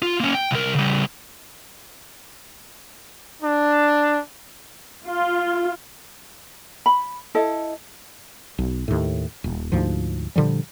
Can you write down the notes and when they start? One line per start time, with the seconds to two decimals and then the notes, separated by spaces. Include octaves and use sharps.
0.02 F4
0.20 A#3 C#4
0.35 G5
0.51 C2 A#4
0.75 C#3 G3
3.43 D4
5.04 F4
6.86 B5
7.35 E4 A4 D#5
8.58 B1
8.88 D#2 A2
9.44 D#1
9.72 D2 G#2 F3
10.36 A#2 D3 F3 G3